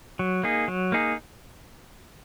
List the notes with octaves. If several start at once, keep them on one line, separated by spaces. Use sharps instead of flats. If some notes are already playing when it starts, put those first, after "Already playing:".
F#3
A#3 D#4 G#4
F#3
A#3 D#4 G#4